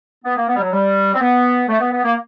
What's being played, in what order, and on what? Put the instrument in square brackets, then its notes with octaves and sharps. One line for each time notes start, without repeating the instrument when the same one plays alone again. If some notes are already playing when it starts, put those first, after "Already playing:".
[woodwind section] B3
A#3
B3
G3
F#3
G3
C4
B3
A3
B3
B3
A#3